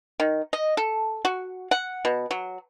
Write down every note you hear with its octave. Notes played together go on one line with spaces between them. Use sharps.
D#3
D#5
A4
F#4
F#5
B2
F#3